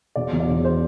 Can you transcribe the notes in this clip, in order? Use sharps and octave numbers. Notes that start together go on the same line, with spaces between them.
E1 D5
E2
D5
E1
C5